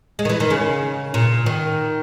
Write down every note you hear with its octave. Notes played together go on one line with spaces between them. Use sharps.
G#3
D#3
E3
D#3
C#3
A#2
D#3